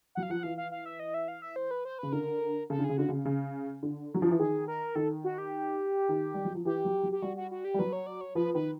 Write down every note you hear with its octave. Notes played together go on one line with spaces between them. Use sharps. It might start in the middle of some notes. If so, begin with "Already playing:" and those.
F#3 F#5
F5
F3 F#5
E3 F5
F5
F5
E5
D#5
E5
F5
E5
C5
B4
C5
C#3 B4
D3 A#4
C#3 A4
D3
G#4
C#3
D3 F#4
C#3
C#3
D3
F#3
F3
E3
D#3 G#4
A#4
D#3 A4
F#4
G4
D#3
G3
F#3
F3
E3 G4
F#3
F#3
G4
G3 F#4
F#4
F#4
G4
G3
F#3 B4
C#5
D5
C#5
F3 B4
D#3 B4